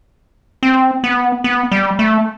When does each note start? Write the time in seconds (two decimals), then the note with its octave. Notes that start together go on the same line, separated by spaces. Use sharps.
0.63 C4
1.04 B3
1.44 B3
1.72 G3
1.99 A3